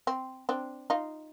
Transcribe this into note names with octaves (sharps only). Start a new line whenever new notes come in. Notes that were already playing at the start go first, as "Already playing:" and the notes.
C4
C4 D4
D#4 F4